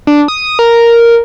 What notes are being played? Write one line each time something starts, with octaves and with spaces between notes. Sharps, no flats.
D4
D#6
A#4